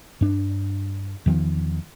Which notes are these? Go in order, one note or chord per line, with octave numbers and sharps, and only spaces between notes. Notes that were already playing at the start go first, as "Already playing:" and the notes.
G2 D4
E2 D#3 F3